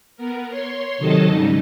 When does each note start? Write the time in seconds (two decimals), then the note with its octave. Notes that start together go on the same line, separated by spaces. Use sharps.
0.17 B3 A#4
0.50 C#5 C6
0.98 C3 D#3 F#3 A4 D#5 A5
1.26 G#2 C#3 G3 D#4